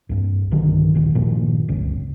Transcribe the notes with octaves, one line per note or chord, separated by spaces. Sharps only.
C2 G2
B1 G2 D3 D#3
F1 A#1 D#2
G1 A#2 D#3 F3
D1 G1 C#2